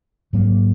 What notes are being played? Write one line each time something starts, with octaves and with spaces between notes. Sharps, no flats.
G#2 F#3 A#3